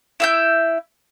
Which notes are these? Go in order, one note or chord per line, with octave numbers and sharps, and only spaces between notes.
E4 E5 G6